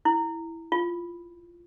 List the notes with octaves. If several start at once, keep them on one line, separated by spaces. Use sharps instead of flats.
E4
F4